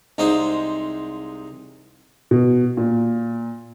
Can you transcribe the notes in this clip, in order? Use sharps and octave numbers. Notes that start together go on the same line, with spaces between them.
C2 G#3 D#4 C5
B2
A#2